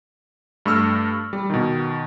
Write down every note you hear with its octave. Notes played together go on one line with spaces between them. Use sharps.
G2 A3 C#6 E6 F6
G3
B2 D#3